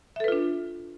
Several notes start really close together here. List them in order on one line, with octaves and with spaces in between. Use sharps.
E5 A4 B4 F4 D4